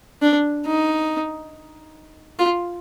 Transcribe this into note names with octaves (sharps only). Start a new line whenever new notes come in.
D4
D#4
F4